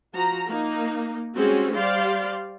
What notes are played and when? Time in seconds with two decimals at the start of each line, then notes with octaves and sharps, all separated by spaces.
0.14 F3 F#4 A#5
0.49 A#3 D#4
1.36 G3 G#3 C4 C#4 F#4 G#4
1.74 G3 G4 C5 D5 F5 C6